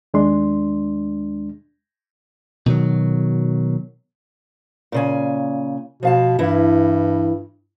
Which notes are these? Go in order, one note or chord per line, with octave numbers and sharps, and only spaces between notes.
D#2 G#3 D4 C6
B2 D#3 F#3
A#2 C#3 G#5
B2 F3 F5 A5
G2 E3 E4